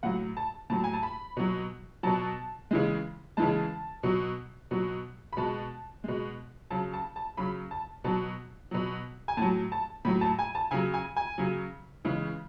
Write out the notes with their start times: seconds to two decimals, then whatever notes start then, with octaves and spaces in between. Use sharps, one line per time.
0.03 A2 F#3 F#5
0.37 A5
0.70 A2 F#3 A5
0.84 G#5
0.93 A5
1.03 B5
1.37 B2 F#3
2.03 B2 F#3 A5
2.71 C#3 E3 G#3
3.37 C#3 E3 G#3 A5
4.03 B2 F#3
4.71 B2 F#3
5.33 B5
5.37 B2 G#3 A5
6.04 B2 G#3
6.71 C#3 F#3 A5
6.93 A5
7.16 A5
7.37 C#3 F#3 B5
7.71 A5
8.04 B2 F#3 A5
8.71 B2 F#3
9.28 G#5
9.37 A2 F#3 A5
9.72 A5
10.05 A2 F#3 B5
10.21 A5
10.39 G#5
10.55 A5
10.71 C#3 F#3 G#5
10.94 G#5
11.16 G#5
11.38 C#3 F#3
12.05 C#3 E3 G#3